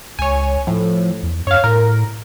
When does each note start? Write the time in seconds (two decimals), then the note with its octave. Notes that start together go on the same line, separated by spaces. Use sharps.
0.19 C#2 C#5 G#5
0.67 A2 F3
1.23 E2
1.47 F#2 C#5 F5
1.64 A2 A#4